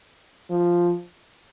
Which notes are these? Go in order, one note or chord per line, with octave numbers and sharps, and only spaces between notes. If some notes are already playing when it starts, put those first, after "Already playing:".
F3